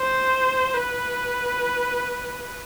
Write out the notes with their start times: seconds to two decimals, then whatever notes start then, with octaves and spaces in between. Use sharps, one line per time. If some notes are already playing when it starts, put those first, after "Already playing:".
Already playing: C5
0.74 B4